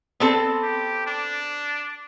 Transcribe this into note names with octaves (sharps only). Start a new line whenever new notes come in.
B3 C4 A4
G4
D4